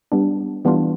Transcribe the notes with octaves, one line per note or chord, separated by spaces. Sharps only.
G3 B3 D4
E3 G3 B3 D4 F4